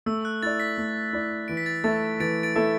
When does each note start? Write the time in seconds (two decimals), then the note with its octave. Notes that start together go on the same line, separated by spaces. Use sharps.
0.06 A3 E6
0.25 F#6
0.43 E4 D5 A6
0.60 B6
0.78 A3
1.13 E4 D5
1.48 E3 D7
1.57 B6
1.66 A6
1.84 A3 E4 A4 E5 A6
2.20 E3 A6 D7
2.43 A6 D7
2.55 A3 E4 A4 E5